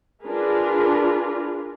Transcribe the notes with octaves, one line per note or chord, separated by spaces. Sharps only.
D4 F4 G#4 A#4 B4